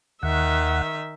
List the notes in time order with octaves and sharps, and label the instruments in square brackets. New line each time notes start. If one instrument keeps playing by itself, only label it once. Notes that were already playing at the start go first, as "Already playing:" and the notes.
[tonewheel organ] D#2 F#5 [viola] D#3 E5